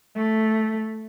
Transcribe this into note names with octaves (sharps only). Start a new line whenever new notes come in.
A3